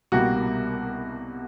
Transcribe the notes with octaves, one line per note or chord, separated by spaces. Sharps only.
C2 B2 G3 A#3 F#4